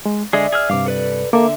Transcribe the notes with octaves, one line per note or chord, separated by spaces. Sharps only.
G#3
D3 G#3 G#4 D5 E5
G#4 E6 F6
G2 C3 F5 D6
A4 B4 D5
D3 A#3 A4 E5 D6